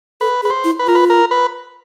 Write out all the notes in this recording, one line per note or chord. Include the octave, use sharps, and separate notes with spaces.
A4 B4
G#4 B4
C5
E4
B4
F4 A#4
B4
A#4
B4